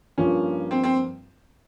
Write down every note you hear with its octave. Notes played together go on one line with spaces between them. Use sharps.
G2 F3 A#3 C#4 F4
C4
C4